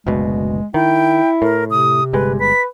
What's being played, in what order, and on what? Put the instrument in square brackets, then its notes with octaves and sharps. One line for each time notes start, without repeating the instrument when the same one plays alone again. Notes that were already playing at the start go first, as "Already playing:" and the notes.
[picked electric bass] F#1 D2 B2 [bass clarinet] G#3
[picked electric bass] D#3 [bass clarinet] E4 [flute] G5
[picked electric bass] A2 [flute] A#4
[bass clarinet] C3 [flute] D#6
[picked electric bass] G1 G3 G#3 [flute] B4
[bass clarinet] B4 [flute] B6